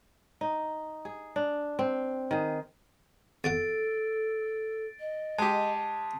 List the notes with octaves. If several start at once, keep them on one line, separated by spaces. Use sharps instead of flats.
D#4
G#4
D4
C4
D#3 G#4
E2 B2 A4 F#5 A6 D7
D#5
G#3 G4 A5